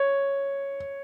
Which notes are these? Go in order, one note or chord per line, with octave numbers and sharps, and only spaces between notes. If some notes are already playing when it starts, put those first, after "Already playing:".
Already playing: C#5